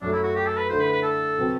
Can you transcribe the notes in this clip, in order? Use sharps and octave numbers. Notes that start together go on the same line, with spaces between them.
F#2 F#3 A3 D4
E4
F#4
G4
A4
B4
D3 A3 E4 C5
B4
B4
A4
C3 F#3 C4 F#4 B4